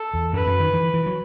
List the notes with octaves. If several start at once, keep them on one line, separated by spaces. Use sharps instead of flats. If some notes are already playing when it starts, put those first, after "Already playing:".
Already playing: A4
E2
F#2 B4
F#2
D#3
E3
E3
F#3